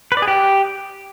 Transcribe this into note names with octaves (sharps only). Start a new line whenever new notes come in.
B4
D5
G#4
G4